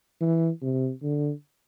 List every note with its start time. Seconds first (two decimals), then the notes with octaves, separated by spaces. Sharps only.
0.21 E3
0.62 C3
1.03 D3